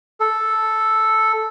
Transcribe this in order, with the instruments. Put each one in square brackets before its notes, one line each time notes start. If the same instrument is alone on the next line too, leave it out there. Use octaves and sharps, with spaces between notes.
[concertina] A4